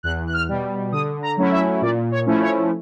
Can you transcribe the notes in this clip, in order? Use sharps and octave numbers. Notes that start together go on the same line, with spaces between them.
E2 F#6
F#6
F6
B2 G3
D3 D#6
A#5
F#3 A3 C#4 E4
E5
A#2 D5
C#5
F3 A3 C#4 E4
C#5